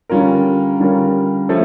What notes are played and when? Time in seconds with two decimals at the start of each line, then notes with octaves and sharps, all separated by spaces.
0.10 D3 G3 C#4 F4 A#4
0.80 D3 G3 C#4 F4 A#4
1.49 F3 A3 C#4